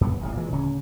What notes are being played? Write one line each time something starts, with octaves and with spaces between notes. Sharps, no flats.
F#2 A#3 B3
D#1 A1 A2 C3
A#2 E3 G#3
D1 C#3 C#4